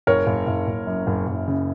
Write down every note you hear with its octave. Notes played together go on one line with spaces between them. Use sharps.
F#1 A#4 C#5
F#1
F#1
F#1
F#2
F#1
F#1
C#3